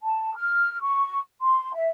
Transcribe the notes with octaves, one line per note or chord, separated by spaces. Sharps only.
A5
F6
C#6
C6
E5